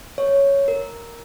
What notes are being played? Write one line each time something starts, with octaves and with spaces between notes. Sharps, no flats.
C#5
A#4